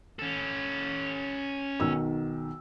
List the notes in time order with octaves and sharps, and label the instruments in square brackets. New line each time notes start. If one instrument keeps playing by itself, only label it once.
[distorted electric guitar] C#4 A4
[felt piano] B1 D#3 E6